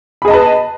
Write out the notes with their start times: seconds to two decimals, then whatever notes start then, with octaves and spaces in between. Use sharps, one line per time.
0.22 B5
0.25 G#4
0.28 D#5
0.31 A5
0.34 B4